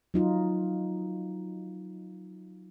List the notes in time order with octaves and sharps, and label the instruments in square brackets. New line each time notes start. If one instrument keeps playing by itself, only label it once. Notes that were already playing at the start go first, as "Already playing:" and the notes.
[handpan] F#3 D#4 F4